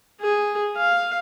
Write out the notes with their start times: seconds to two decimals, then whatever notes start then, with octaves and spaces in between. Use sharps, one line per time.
0.21 G#4
0.77 F5